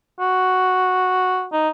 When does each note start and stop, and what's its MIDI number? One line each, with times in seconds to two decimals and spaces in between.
0.20 1.46 66
1.53 1.69 63